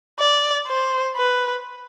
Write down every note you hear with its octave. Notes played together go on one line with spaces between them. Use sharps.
D5
C5
B4